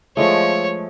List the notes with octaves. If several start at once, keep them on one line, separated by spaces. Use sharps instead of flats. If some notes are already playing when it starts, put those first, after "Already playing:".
F3 G#3 A3 C#5